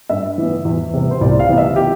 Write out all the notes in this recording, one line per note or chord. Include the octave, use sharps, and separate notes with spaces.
G2 E5
E3 B3
E2
C3 G3 B3
C5
C2 D5
F5
C3 E3 B3
E5
G4